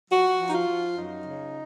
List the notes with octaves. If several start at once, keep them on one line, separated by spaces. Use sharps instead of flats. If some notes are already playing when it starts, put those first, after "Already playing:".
F3 F#4
F3
D#4
F4
F3
F#2 D#4
C#3